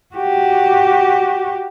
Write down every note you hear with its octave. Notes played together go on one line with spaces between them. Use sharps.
F#4 G4